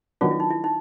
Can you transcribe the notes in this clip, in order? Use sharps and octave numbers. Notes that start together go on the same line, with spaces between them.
D#3 F#3 B3 D4 F4
E4
D#4
E4
D#4